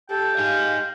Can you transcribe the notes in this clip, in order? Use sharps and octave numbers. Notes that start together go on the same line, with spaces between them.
G4 A4 G5
D#4 G#4 F5